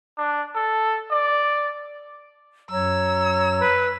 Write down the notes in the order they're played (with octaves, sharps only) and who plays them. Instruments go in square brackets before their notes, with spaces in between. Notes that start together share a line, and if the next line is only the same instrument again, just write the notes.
[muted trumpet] D4
A4
D5
[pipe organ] F#2 [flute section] C#5 A#5 [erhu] E6
[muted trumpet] B4